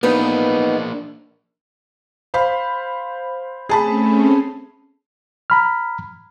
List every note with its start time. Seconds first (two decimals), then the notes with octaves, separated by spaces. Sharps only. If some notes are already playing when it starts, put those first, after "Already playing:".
0.03 A#3 B3 D4 D#4 B4
2.34 C5 F5 B5
3.69 A3 C4 C#4 G#4 A5 B5
5.50 A#5 B5 F6